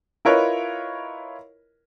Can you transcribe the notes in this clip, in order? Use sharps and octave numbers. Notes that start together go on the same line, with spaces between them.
E4 F4 A#4 B4 C#5 D#5